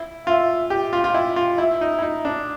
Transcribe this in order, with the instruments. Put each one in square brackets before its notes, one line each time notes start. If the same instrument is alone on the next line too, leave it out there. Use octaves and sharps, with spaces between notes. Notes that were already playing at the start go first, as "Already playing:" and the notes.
Already playing: [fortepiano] E4
[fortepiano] F4 [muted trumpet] E5
[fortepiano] G4
F4
F4
E4
F4
[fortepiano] E4 [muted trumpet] E5
[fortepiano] D#4
E4
D#4
D4